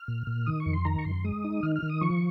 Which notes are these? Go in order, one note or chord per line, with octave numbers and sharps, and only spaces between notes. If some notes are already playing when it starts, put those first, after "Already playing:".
Already playing: F6
A#2
A#2
D#3 D#6
C#6
F2
C6
D#3 A#5
C#6
F#2 C6
G#3 D#6
D#4
D#3 F6
F6
D#3
D#6
F3 C#6